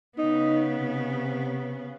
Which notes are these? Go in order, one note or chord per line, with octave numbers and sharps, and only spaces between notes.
C#3 B3 D#4
C3